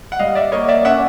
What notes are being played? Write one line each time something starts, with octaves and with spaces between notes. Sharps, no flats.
F#5
G3 D#5 F5
D5 E5
A#3 C#5 D#5
D5 E5
C#4 E5 F#5